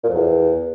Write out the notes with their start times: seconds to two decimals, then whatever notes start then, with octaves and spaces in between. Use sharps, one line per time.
0.03 A#2
0.09 F2
0.14 E2